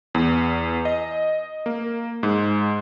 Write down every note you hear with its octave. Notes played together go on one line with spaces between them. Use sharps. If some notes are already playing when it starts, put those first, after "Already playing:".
E2
D#5
A#3
G#2